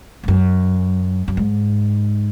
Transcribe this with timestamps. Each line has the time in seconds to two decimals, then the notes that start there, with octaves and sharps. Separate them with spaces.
0.23 G#2
0.28 F#2
1.28 F#2
1.37 G#2